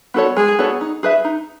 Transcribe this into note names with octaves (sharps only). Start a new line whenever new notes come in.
B3 F#4 A4 C#5
G#3 G#4
B3 F#4 A4 C#5
D#4
G#4 B4 E5
D#4